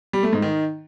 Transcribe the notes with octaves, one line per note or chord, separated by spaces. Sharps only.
G3
A3
G#2
D#3